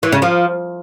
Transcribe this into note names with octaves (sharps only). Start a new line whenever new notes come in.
E3
C#3
F3